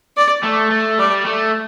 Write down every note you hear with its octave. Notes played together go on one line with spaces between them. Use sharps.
D5
A3
A3
G3 D5
A3